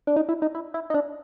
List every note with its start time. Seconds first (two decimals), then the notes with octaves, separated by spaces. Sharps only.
0.07 D4
0.16 D#4
0.29 E4
0.42 D#4
0.55 E4
0.74 E4
0.90 D#4
0.94 D4